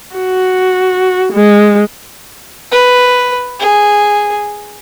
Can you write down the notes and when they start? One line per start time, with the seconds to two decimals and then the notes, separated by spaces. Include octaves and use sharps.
0.15 F#4
1.33 G#3
2.72 B4
3.60 G#4